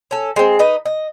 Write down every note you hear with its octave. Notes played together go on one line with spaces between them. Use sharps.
C#4 A4
G#3 C4
D#4 B4 D#5
D#5